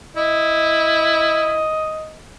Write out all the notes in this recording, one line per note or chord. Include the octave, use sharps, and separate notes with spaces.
E4 D#5